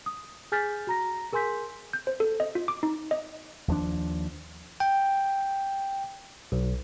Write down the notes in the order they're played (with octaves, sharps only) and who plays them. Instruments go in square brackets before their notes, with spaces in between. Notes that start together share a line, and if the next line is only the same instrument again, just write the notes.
[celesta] D#6
G#4 G#5 F6 G6 A6 B6
F#4 A#5 A#6
G#4 A#4 G#5 C6 G6 B6
[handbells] G6
C5
A4
D#5
F4
D6
D#4
D#5
[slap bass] D#2 F3 D4
[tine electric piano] G5
B1